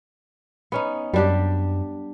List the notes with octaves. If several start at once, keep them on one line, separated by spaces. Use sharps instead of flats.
B3 C#4 D#4
F#2 G3 D4 G4